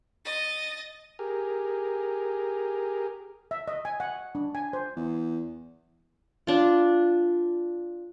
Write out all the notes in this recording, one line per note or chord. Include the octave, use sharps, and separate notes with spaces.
D#5 A6
G4 G#4 A#4
E5
D#5
G#5
F#5
D4
G#5
C5
E2
D4 F4